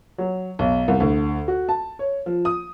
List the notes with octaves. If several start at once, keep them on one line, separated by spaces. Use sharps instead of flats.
F#3
B1
C2
D2
F#4
A5
C#5
F3
D#6